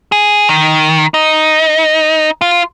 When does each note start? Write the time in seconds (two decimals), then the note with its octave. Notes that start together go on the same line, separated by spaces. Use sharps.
0.12 G#4
0.49 D#3
1.14 D#4
2.41 F4